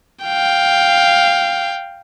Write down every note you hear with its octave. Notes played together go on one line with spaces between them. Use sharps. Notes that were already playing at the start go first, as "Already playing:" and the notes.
F5 G5